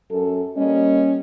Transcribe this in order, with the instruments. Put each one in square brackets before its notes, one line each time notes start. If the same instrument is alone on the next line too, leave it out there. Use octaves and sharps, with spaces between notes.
[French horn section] F#2 A4
[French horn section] G3 A#3 D#5 [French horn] C#4